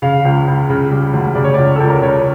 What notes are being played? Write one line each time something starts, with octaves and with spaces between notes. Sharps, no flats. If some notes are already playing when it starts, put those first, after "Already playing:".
C#3 F5
C#2
C#2
C#3
G3
D2
C#3 D5
C#5
C#2 D5
C#2 A4
A#4
C#3 C#5